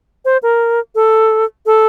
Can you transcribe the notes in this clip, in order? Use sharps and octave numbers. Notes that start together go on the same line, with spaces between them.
C5
A#4
A4
A4